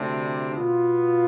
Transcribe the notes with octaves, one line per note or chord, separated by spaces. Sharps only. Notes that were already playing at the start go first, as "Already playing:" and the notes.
Already playing: D2 C3 G3 D4
B2 B3 F4